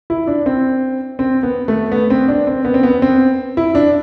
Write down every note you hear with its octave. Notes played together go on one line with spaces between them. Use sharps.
E4
D4
C4
C4
B3
A3
B3
C4
D4
C4
B3
C4
B3
C4
E4
D4